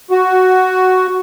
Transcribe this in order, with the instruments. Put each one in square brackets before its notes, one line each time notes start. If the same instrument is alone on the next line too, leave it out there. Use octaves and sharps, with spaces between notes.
[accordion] F#4